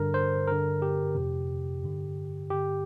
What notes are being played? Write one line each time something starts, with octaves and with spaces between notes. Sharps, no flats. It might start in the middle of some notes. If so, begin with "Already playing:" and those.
Already playing: G2 D3 A#4
C5
G2 D3 A#4
G4
F2 C3
G2 D3
G2 D3 G4